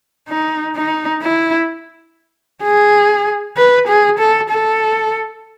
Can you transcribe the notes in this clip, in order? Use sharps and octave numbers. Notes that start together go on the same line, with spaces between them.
D#4
D#4
E4
G#4
B4
G#4
A4
A4